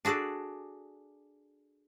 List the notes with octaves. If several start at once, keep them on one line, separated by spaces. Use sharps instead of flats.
D4 F#4 G#4 A4 D5